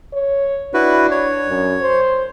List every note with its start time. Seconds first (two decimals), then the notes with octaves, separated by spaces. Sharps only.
0.13 C#5
0.74 D4 E4 F#4 B4
1.11 C#5
1.48 F#2
1.81 C5